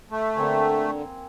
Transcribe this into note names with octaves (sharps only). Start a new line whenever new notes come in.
A3
D3 A#3 C4 G#5